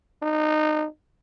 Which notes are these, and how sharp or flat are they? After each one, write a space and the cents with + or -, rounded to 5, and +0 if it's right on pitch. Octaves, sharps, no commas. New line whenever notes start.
D#4 -25